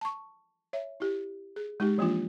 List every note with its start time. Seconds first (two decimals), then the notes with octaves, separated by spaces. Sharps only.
0.01 A5 C#6
0.73 C#5 E5
1.00 E4 G4
1.56 G#4
1.80 G#3 D#4 G4
1.98 E3 F3 A#3 D4 F4